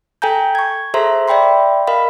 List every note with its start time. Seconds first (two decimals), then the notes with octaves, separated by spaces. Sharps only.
0.22 A4 G5 G#5 A#5 G6
0.55 C#6 G#6
0.94 G#4 A4 C5 E5 A#5 C6
1.28 D5 E5 G5 B5 C6
1.87 A#4 D#5 F5 B5